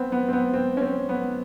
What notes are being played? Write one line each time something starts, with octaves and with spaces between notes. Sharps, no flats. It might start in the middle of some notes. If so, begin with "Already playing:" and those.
Already playing: B3 C4
B3
C4
B3
C4
C#4
C4
B3